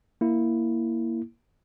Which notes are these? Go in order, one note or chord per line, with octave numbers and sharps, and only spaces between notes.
A#3 E4